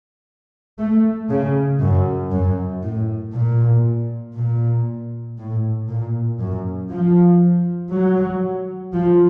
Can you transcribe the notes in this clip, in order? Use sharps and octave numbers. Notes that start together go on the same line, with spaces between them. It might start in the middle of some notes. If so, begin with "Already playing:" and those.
A3
C#3
F#2
F#2
A2
A#2
A#2
A2
A#2
F#2
F3
F#3
F3